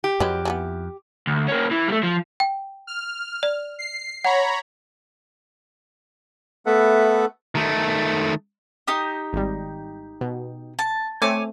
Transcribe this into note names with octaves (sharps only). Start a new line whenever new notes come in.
G4
F2 F#3 G#3 B4
E3 A3 B3
D2
A#3 C#4
E3
G3 A3
F3
G5
F6
D5
C7
C#5 F#5 A#5 B5
A3 B3 A4 B4 E5 F#5
D#3 A3
D#4 G4 D#6
G#1 G3
B2
A5
A3 C4 C#5 G#5 D6